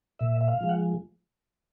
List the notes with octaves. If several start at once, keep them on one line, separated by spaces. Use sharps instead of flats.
A#2 E5
E5
F5
F3 G#3
F#5